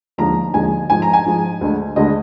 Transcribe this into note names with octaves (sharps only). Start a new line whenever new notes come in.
D#2 D3 F3 G#3 A#5
D#2 D3 F3 G#3 G#5
G#2 F3 G#3 G#5
A#5
G#5
G#2 F3 G#3
D2 D3 G#3
D2 D3 G#3 D#5